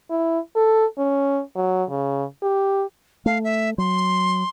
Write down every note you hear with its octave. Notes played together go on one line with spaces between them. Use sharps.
E4
A4
C#4
F#3
C#3
G4
A3 F5
E5
F#3 C6